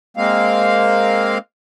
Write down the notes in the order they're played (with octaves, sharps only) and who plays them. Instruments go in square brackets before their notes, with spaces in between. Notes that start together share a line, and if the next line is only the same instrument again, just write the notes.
[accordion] G#3 A#3 C4 F5